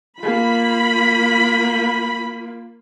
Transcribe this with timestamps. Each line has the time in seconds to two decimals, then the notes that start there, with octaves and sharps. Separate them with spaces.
0.20 A#3 F4 B5